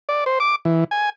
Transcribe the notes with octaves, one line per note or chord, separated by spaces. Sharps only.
D5
C5
D6
E3
G#5